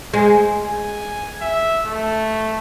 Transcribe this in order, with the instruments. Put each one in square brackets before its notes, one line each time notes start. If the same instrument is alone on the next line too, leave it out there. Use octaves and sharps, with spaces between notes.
[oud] G#3 [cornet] C5
[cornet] G#5
E5
A3